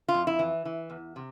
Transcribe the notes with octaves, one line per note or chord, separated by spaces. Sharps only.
F4
F2
E4
E3
E3
E2
C3